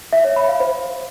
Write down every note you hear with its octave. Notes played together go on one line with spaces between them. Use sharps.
E5
C#5
B5
F5
C5